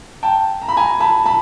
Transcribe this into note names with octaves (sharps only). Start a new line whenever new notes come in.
G5 A5
A#5
B5
G#5 A#5
A5 B5
A5 B5